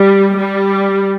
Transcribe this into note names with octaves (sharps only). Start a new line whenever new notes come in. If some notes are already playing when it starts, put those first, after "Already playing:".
Already playing: G3
G3